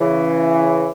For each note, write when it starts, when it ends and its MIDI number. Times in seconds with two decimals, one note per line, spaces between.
0.01 0.89 49
0.01 0.89 52